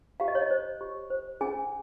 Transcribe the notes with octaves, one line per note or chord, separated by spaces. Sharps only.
G4 F5
D#5
C#5
D#5
C5
G4
C5
C#4 G#4 G#5